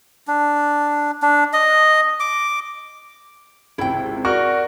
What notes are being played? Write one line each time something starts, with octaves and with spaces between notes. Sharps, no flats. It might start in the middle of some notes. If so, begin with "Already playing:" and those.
D4
D4
D#5
D6
G#1 C#2 C3 E4 G5
F#4 A#4 D5 C#6